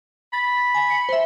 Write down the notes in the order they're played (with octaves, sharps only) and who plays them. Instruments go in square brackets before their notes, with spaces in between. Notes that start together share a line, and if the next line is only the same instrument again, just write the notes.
[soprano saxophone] B5 [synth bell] A6
[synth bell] G#5
C#7
C5 E5